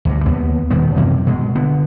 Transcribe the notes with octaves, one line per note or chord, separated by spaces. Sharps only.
D2 G2
D#2 B3
D#1 B2 D#3 B3
F#2 C3 D#3 E3
B2 G#3
D3 B3